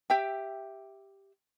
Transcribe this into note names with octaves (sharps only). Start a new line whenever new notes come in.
G4 E5 G5